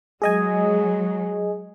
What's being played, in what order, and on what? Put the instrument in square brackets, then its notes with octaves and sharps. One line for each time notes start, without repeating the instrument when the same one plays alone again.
[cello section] F#3 G#3 [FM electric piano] G#4 D#5 G#5